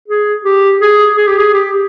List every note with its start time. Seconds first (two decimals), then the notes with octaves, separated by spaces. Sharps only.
0.08 G#4
0.45 G4
0.81 G#4
1.17 G#4
1.28 G4
1.38 G#4
1.53 G4